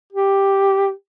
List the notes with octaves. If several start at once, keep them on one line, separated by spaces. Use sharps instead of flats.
G4